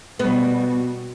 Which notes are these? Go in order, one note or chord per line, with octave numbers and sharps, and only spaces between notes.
B2 G3 B3 F#4